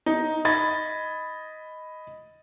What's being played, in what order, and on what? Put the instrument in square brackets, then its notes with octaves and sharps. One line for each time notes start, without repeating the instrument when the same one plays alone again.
[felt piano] D#4
D#5 B5 G#6 A6